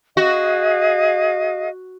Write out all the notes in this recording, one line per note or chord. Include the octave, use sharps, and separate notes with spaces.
F#4 G#4 D#5 F5